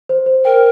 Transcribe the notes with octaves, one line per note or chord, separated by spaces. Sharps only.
C5
C5
A#4 G5